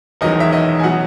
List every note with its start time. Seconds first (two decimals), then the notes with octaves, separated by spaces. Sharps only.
0.21 E1 E2 D#3 F#3 C#4 D#5
0.40 E5
0.52 D#5
0.79 G#5
0.83 B2 F#3 F#5